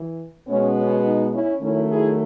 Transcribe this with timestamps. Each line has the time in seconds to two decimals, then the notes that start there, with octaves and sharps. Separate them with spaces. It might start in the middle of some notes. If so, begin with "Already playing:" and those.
Already playing: E3
0.47 B2 G#3 B3 C#4
0.75 C#4
1.04 D#4
1.32 C#4 E4
1.61 D#3 F#3 A3 C#4 E4
1.88 E4 G#4